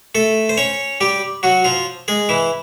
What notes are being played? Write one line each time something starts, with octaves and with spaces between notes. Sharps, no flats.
A3 A4
C5
C#4 C#5
G3 G4
F#3 F#4
F3 F4
G#3 G#4
E3 E4